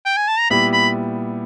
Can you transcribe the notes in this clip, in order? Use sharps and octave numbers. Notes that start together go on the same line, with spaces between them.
G5
G#5
A5
A#5
A#2 G3 B3 E4 G4 B5
B5